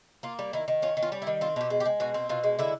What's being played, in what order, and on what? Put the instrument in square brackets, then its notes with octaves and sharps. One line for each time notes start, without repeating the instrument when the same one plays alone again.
[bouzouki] A#3 F4
G3
D#3 E4
D#3
C#4 F4
D#3
F4
G3
E4
D#3
C4 F4
B2 G4
G#3
G4
G#3
B2 F#4
C4
B2 F4
G#3
D3 E4